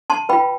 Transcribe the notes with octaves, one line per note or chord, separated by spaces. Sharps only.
A5 C6
F4 B4 G5 B5